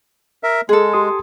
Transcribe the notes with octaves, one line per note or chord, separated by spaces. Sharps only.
A#4 E5
G#3 G#4 A4
G4 C6 D#6